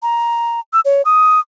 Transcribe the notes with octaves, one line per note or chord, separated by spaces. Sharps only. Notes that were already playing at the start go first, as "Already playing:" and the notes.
A#5
E6
C#5
D#6